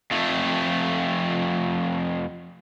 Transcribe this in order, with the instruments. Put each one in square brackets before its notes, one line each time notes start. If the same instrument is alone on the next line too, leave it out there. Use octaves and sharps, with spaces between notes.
[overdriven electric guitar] F2 A3